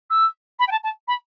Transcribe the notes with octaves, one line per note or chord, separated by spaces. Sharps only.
E6
B5
G5
A5
A5
B5